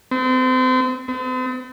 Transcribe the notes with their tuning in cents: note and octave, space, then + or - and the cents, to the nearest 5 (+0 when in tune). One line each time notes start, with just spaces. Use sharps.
C4 -35
C4 -45